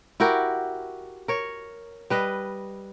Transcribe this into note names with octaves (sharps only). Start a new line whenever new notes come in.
E4 F#4 G4 A#4
A#4 C#5
G3 B4 D#5